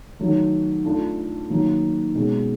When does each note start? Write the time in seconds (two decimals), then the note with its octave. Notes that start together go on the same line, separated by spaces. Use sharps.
0.19 D#3 F#3 A3
0.85 A3 D4 F4 A4
1.50 D#3 F#3 A#3
2.15 B2 G#3 C#4